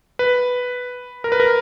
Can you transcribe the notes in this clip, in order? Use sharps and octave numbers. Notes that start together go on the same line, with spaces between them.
B4
A#4
B4
A#4